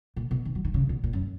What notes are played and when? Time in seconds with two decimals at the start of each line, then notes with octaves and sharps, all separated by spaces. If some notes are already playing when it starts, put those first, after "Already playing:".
0.16 A#2
0.31 B2
0.45 D#3
0.55 F#3
0.65 D#3
0.74 C#3
0.89 B2
1.04 A#2
1.13 F#2